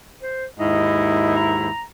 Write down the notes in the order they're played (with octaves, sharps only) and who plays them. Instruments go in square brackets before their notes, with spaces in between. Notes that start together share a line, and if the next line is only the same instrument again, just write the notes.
[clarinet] C5
[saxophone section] D#2 G#2 E4 [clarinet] D#5
[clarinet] A#5